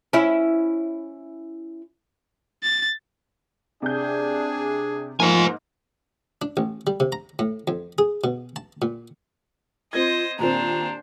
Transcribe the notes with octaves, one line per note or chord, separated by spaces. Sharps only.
C#4 E4
A6
C3 D4 G#4 G6
G#2 F3 A#3 F4 C5 G#5
D4
A1
G3
C3
A#5
A2
F2
G#4
B2
A5
A#2
C4 F4 C5 D#5 G#6
D#2 A#2 C4 D4 C5 A#5